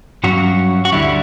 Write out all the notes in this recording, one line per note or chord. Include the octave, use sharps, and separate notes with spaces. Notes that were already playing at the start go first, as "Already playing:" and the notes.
G2 F#3 C#4 F#4
F#4
D2 D3 G3 E4